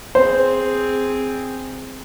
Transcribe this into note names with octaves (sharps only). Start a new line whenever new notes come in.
C4 G#4 C5